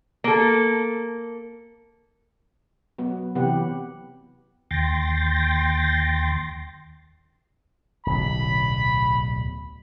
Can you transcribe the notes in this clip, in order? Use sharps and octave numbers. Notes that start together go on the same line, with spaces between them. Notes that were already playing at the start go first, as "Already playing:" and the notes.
A#3 A4
F#3 B3
C3 E3 B3 G4 F#5
D#2 G5 C6 A6 A#6
D1 B1 B5